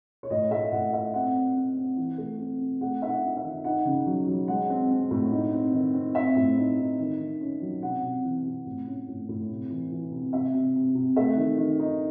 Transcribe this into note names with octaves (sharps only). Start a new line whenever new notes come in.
C#5
A2 D#5
A3 E5
A2 F#5
A3 E5
C4 F#5
C4
C4
C4
E3
A3
C4
C4
A3 F#5
D#4 E5
F#5
D#4
E5
D#3
D#4 F#5
C#3
F#3
F#3
G#3 F#5
C4
C4
A2
D#4
C4
D#3
C4
C4 E5
A2
D#4
D#4
D#3
D#3
C#4
F#3
C3 F#5
C3
E3
C3
A2
C#4
A2
A2
C3
E3
E3
C3
C3 E5
C3
C3
C3
A3 E5
D#3
D#3
D#4